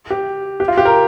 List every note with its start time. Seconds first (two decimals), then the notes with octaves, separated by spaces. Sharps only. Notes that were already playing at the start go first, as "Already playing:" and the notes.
0.10 G4
0.60 G4
0.68 F4
0.77 G4
0.85 A#4